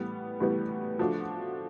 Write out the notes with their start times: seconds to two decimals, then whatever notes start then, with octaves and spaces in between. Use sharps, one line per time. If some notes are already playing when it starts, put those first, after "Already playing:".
Already playing: A2 E3 G3 B3
0.40 A2 E3 G3 B3
0.99 F3 A3 D4 F#4